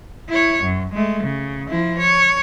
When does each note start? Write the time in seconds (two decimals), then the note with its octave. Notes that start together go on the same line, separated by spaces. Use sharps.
0.29 E4 C#5
0.63 F#2
0.93 G#3 A3
1.23 C#3
1.68 F3 E4
1.99 C#5